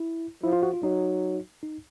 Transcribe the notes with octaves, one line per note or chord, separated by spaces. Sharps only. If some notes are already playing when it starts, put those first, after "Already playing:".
Already playing: E4
F3 E4
F4
F#4
F4
F#3 D#4
D#4